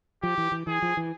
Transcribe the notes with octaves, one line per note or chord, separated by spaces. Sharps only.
F3 G4
E3
E3
E3 G#4
F3
E3